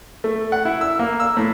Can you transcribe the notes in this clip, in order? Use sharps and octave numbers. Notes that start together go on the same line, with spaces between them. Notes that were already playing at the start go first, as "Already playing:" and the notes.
A3
F#5
E4
E6
A#3
E6
A2